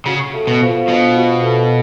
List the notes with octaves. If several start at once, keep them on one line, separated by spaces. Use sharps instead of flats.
C#3 F#4
A3
B2
F3
B2 D4
F#4
A3